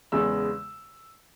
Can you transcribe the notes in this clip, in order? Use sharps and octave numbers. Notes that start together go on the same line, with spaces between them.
E2 C#3 G#3 B3 E6